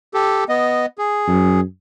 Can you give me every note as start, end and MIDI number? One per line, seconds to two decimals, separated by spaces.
0.14 0.44 67
0.14 0.44 69
0.49 0.86 59
0.49 0.86 75
0.98 1.61 68
1.28 1.60 42